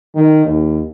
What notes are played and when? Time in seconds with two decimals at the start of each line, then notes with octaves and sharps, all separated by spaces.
0.15 D#3
0.45 D#2